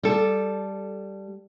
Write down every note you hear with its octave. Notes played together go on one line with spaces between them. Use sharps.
G3 A4